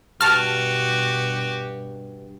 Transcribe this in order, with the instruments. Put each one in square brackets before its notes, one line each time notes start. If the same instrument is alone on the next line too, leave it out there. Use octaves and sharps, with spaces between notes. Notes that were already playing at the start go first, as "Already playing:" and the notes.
[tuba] G2 [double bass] B2 [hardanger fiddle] F#4 G4 [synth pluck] A5 F6